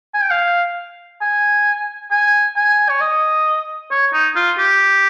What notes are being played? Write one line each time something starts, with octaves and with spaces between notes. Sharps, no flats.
G#5
G5
F5
G#5
G#5
G#5
C#5
D#5
C#5
D#4
F4
G4